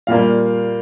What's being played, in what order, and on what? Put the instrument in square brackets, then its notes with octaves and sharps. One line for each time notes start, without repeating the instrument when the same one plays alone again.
[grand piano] A#2 G3 A#3 F5